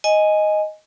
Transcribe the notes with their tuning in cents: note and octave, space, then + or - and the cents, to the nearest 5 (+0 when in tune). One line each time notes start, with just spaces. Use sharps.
D#5 +0 G#5 +0